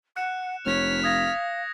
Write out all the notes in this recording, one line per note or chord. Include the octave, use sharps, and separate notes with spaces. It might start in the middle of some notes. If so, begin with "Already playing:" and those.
F#5 F#6 C#7 E7
F1 C#5 F6 B6
F5 D#6 G#6 A#6